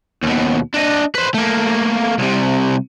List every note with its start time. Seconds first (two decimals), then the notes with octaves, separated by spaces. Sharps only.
0.23 D#2 B2
0.74 D4 D#5
1.15 B4 C5
1.34 A3 A#3
2.18 C2 C3